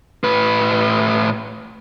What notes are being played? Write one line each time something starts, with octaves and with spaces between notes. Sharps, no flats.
A2 B4